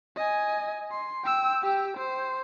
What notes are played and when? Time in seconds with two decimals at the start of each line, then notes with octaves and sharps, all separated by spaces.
0.17 D#5 G#5
0.91 C6
1.25 G5 E6
1.63 G4 G5
1.98 C5